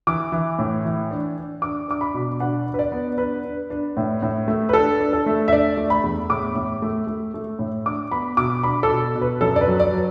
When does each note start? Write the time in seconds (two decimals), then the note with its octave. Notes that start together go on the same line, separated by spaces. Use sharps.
0.07 E3 D6
0.32 E3
0.59 A2
0.85 E3
1.11 D4
1.37 D4
1.62 D4 D6
1.88 D4 D6
2.01 B5
2.14 B2
2.40 D4 F#5
2.66 D4
2.74 B4
2.79 D5
2.92 B3
3.18 D4 B4
3.45 D4
3.70 D4
3.97 A2
4.22 A2
4.48 A3
4.69 B4
4.73 D4 A4
5.00 D4
5.13 A4
5.26 A3
5.48 E5
5.52 D4 D5
5.77 A3
5.90 B5
6.03 E2
6.30 A2 D6
6.55 A2
6.82 A3
7.07 A3
7.34 A3
7.59 A2
7.86 D4 D6
8.11 B3 B5
8.37 B2 D6
8.63 D4 B5
8.83 A4
8.90 B2
9.15 B2
9.21 B4
9.41 F#2 A4
9.56 D5
9.61 B4
9.67 F#3
9.80 D5
9.93 F#3